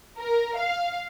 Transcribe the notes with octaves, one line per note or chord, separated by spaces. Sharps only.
A#4
F5